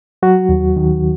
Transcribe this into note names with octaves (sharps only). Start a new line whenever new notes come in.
F#3 F#4
D#2
D#3